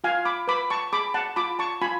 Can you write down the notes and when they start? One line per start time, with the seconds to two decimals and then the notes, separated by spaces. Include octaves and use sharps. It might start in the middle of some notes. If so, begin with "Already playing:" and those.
0.04 F4 F5 G#5
0.25 B5 D6
0.48 B4 B5 D6
0.70 A5 C#6
0.93 G#4 B5 D6
1.14 F#5 A5
1.36 F4 B5 D6
1.59 A5 C#6
1.81 F4 G#5 B5